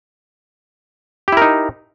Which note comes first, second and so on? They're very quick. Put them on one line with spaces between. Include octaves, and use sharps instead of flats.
G4 E4 A#4 D#4